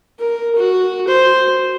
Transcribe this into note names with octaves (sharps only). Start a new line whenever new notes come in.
A#4
F#4
C5